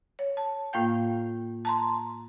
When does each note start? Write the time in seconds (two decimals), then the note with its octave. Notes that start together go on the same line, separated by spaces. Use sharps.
0.19 C#5
0.37 A5
0.73 A2 A#3 F4 F5 G5 G6
1.65 A5 A#5 C6